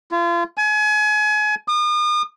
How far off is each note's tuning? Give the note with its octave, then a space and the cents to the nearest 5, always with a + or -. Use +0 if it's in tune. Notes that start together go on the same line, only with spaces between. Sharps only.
F4 -35
G#5 +30
D#6 -40